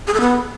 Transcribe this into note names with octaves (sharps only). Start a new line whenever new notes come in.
G#4
A4
B3